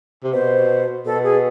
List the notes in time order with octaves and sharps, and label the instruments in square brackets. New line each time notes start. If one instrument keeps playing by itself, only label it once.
[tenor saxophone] C3
[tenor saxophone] B2 [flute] C5
[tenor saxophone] B2 [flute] A4
[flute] G#4